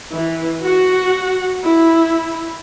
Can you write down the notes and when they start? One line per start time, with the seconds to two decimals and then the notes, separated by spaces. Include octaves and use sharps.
0.12 E3
0.62 F#4
1.64 E4